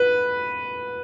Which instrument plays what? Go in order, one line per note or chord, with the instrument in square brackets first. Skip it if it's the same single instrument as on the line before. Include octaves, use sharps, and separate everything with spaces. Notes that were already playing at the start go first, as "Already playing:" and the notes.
Already playing: [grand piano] B4